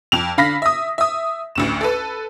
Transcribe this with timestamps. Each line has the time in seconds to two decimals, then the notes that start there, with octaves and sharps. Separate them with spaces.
0.12 F2 F7
0.38 D3 F5 B5 A#6 B6
0.62 E5 D#6
0.98 E5 D#6
1.55 A1 D2 E7
1.81 A4 B4